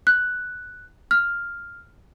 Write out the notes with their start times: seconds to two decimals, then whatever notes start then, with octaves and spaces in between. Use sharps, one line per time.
0.07 F#6
1.11 F6